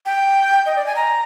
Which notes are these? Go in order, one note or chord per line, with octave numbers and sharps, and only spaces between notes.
G5
D#5
D5
G#5
A#5